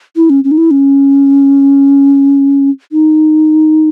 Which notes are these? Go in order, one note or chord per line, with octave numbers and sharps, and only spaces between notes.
E4
C#4
C#4
D#4
E4
C#4
D#4